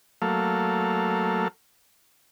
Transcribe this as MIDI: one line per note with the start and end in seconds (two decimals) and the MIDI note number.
0.22 1.48 54
0.22 1.48 57
0.22 1.48 58
0.22 1.48 69
0.22 1.48 77